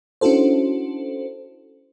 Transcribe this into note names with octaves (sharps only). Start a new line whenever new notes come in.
C#4 D4 E4 F#4 A4 C5